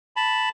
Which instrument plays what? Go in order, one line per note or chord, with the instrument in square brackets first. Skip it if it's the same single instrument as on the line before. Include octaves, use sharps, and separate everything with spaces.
[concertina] A5 B5